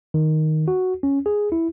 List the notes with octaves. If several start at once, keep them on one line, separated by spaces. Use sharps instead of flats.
D#3
F#4
C#4
G#4
E4